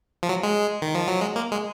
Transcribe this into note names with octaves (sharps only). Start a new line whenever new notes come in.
F3
F#3
G#3
D#3
F3
F#3
G#3
A#3
G#3